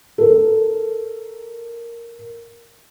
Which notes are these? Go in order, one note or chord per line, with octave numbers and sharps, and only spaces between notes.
A4 A#4